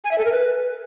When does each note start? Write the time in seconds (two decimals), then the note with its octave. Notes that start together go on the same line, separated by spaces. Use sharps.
0.04 G#5
0.11 E5
0.18 A4
0.25 A#4
0.32 B4